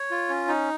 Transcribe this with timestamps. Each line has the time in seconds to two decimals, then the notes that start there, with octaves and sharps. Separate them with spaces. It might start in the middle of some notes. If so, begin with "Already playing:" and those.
Already playing: C#5
0.11 F4
0.29 C#4
0.48 D#4